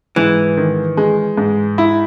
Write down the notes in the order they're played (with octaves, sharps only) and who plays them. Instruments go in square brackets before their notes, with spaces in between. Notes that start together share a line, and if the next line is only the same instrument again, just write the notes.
[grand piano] G#2 [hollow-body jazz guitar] E3
[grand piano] D#3
G#3
G#2
E4